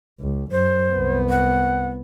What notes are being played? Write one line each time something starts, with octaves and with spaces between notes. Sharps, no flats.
C#2
F#2 C5
C2 B3
F#5